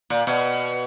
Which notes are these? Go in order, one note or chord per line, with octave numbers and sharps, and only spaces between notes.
A#2
B2